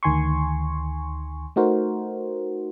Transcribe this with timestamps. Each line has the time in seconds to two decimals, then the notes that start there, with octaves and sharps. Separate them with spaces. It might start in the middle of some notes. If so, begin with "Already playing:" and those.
0.03 D2 D#3 G#5 C6 C#6
1.56 A3 D#4 F#4 A#4 C5